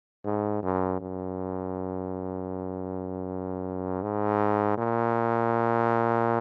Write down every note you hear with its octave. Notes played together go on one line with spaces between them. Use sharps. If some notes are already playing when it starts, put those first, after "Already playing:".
G#2
F#2
F#2
G#2
A#2